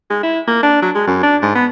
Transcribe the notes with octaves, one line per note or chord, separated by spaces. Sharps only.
G#3
E4
A#3
D4
F#3
G#3
F#2
D4
G#2
B3